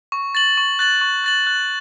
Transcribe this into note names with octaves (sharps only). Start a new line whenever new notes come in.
C#6
A6 F#7
C#6
F#6 A6 F#7
C#6
F#6 A6 F#7
F#6